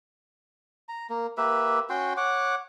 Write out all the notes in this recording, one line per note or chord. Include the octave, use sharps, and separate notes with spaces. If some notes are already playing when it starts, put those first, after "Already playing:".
A#5
A#3
A#3 G4 B4 E5
C#4 F#4 G5 C6
C#5 F#5 D6